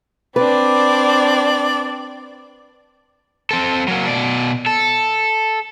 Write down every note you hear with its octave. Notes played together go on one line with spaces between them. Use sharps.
C4 D4 B4 D5
C4 A4
F#3 A#3
B2 D5
A4